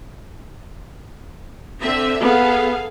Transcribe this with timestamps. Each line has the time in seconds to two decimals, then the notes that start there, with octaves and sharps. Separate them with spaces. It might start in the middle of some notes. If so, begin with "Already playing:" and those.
1.80 D3 C4 E5
2.20 B3 G#4 A4 F5